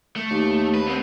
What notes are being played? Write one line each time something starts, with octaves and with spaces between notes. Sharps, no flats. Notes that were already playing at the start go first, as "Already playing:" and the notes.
A3
D#2
B4
B3 C4